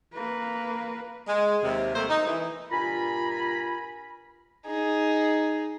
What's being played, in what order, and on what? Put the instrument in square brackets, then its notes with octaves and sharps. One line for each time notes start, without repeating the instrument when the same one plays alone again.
[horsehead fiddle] A#3 B4
[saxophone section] G#3
D#2 C3
C3 G3 A3 A#3 C5
D#4
E3
[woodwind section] G2 A#2 F4 G#5 A#5 B5
[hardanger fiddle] D#4 G#4